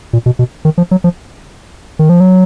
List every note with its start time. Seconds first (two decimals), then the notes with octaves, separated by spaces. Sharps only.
0.13 A#2
0.26 B2
0.39 B2
0.65 D#3
0.78 F3
0.91 F#3
1.04 F3
1.99 D#3
2.09 F3
2.20 F#3